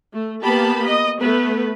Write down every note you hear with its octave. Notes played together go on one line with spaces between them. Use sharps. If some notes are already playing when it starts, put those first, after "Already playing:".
A3
A#3 B3 G4 A5 B5
D#5
A3 B3 B4